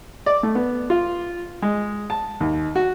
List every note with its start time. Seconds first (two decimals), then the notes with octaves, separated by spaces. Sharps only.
0.26 D5
0.43 A3
0.55 B3
0.90 F4
1.62 G#3
2.10 A5
2.40 D#2
2.76 F#4